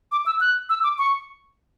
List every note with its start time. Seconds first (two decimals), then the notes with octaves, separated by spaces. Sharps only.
0.12 D6
0.26 E6
0.40 F#6
0.69 E6
0.83 D6
0.98 C#6